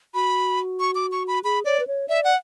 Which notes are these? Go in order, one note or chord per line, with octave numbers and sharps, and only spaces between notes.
F#4 B5
C#6
D6
C#6
B5
G#4 B5
C#5 D5
B4
C#5
D5 E5
F#5